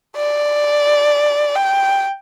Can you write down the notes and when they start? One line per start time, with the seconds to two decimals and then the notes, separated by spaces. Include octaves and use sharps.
0.16 D5
1.55 G5